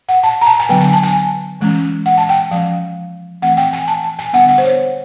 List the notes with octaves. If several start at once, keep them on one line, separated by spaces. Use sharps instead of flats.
F#5
A5
A#5
A5
G#5
D3 F#3 B3 D4 G5
G#5
A5
G#5
E3 G#3 C#4
F#5
A5
G5
F3 G#3 C#4 F5
E3 A3 C4 F#5
G5
G#5
A5
A5
G#5
D3 G3 B3 D4 F#5
F#5
C5
C#5